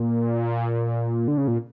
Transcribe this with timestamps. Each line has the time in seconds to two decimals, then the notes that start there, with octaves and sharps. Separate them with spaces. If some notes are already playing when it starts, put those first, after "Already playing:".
Already playing: A#2
1.28 D3
1.38 C#3
1.48 A#2